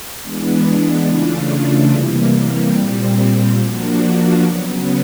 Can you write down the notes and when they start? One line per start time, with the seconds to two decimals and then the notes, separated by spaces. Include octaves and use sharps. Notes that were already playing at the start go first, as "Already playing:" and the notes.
0.22 E3 G#3 B3 D4
1.06 C#3 E3 A3 D4 F4
1.90 C3 E3 G3 A#3
2.75 A#2 G3 C4
3.59 F3 A#3 D4 F#4
4.43 C#3 F#3 B3